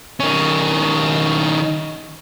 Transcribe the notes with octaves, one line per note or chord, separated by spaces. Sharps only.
D#3 C#4